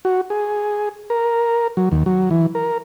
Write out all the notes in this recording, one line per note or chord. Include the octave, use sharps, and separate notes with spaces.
F#4
G#4
A#4
F#3
D#2
F#3
E3
A#4